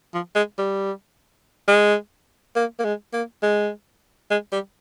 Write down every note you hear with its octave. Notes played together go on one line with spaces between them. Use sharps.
F3
G#3
G3
G#3
A#3
A#3
G#3
A#3
G#3
G#3
G3